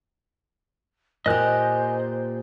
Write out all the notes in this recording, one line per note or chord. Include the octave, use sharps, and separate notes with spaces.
A#2 G4 C5 D#5 G#5 F#6